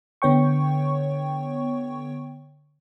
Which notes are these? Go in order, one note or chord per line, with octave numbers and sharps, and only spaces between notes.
D3 B3 C#5 G5 C#6